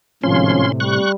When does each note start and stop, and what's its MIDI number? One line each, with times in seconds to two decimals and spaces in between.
0.24 0.63 32
0.24 0.98 45
0.24 0.98 48
0.24 0.63 53
0.24 0.72 61
0.24 0.72 84
0.80 1.15 55
0.80 1.12 85
0.80 1.12 90